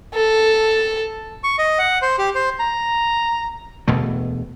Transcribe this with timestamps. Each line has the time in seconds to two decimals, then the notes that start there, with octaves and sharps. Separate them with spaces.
0.14 A4
1.44 C#6
1.58 D#5
1.78 F#5
2.02 C5
2.18 G4
2.35 C5
2.60 A#5
3.88 E1 D2 B2 A3